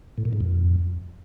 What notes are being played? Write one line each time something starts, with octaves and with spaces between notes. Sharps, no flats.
A2
A#2
G#2
F2